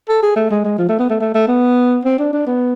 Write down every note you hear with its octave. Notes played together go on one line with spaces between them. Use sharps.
A4
G#4
A3
G#3
G#3
F3
A3
B3
A3
A3
A3
B3
C4
D4
D4
B3